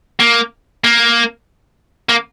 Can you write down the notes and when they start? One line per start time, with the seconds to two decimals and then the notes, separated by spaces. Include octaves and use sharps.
0.20 A#3
0.84 A#3
2.09 A#3